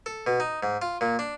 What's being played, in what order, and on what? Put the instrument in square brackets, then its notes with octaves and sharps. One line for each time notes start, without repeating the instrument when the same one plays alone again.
[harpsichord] A4
B2
D#4
G#2
F4
A#2
D4